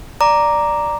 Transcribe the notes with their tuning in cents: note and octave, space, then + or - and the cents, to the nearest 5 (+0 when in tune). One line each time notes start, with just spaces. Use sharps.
D5 +0 A#5 +0 D6 +0